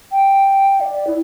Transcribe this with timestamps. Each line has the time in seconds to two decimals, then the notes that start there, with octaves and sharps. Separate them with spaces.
0.12 G5
0.81 D5
1.07 E4